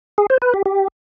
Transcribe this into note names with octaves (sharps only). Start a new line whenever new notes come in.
G#4
C5
B4
G4
G4